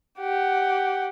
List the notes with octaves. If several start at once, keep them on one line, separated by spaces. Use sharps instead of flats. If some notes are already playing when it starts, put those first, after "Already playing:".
G4 F#5